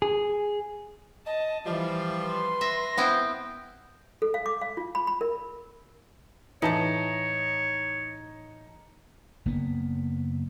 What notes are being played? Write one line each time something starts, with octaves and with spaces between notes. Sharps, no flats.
G#4
D#5 A5
E3 F3 G3 F5
B4 C6
E5 A#6
B3 C4 E4 G5
A4
F5
D6
F5
F4
B5
B5
A#4
A2 E3 D#4 C#5 A5
F#1 A#3 B3